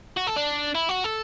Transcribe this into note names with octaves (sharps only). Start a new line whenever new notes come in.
F#4
A4
D4
E4
F#4
A4